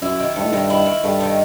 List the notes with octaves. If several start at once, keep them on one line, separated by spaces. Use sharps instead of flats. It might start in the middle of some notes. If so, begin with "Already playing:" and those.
F#2 E4
D#3
G2 A3
A2
G2 D#3
E4
D#3
G2 A3
D#3